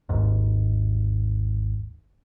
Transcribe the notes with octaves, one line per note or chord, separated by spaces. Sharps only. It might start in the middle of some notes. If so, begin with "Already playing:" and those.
G#1 D#2 G#2